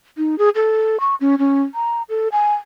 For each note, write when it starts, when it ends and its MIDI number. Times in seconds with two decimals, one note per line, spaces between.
0.17 0.38 63
0.38 0.49 68
0.55 1.00 69
1.00 1.15 85
1.21 1.35 61
1.39 1.63 61
1.75 2.03 82
2.09 2.28 69
2.32 2.54 80